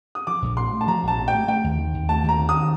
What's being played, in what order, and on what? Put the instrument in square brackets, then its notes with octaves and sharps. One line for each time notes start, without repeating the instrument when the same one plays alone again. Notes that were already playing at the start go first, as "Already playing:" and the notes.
[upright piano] D#6
[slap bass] F3 [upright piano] D6
[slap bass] A#1
[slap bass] A2 [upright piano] C6
[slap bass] A3
[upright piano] A5
[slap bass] F3 [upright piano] A#5
[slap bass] A#1 [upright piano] A5
[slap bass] A2
[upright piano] G5
[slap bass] A3
[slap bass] A3 [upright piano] G5
[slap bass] D#2
D#3
D#2
[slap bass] A3 [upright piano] A5
[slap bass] D#2
[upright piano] A#5
[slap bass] D#3
[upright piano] D#6